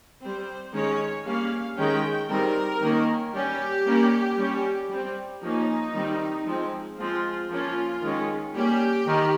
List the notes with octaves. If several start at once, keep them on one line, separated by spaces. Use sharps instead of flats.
G3 C4 C5
D#3 G#3 C#4 C#5
G3 A#3 C#4 F5
D#3 G#3 C#4 G5
D#3 G3 C4 A#4
D#3 A#3 C#4
G3 C#4 G4
G3 A#3 C#4
G3 C#4
G3 C4
F3 A#3 C#4 D#4
D#3 G3 C4
F3 G#3 C4
F3 G#3 C4 F4
F3 A#3 C#4 F4
D#3 G#3 C#4
G3 A#3 C#4 G4
D#3